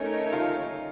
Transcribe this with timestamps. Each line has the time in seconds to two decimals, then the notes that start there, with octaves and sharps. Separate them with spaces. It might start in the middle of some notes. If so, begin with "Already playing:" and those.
Already playing: A3 C#4 D#4 A#4 C#5
0.32 F4